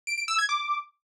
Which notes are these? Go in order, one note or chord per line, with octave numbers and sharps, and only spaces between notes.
D7
D7
E6
G#6
D6